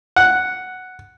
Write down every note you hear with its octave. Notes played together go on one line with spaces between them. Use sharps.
F#5